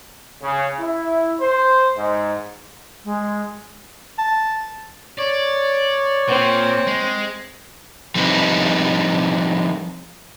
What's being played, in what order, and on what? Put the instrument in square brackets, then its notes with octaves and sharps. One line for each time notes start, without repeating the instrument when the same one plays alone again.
[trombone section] C#3
E4
C5
G#2
[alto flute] G#3
[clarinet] A5
[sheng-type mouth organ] C#5 [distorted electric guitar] D5
[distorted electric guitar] A#2 [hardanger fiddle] C4
[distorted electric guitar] G#3
[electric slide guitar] F3 G3 C4 D#4 B4